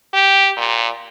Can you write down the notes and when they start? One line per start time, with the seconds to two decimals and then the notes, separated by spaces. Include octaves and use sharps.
0.14 G4
0.57 A#2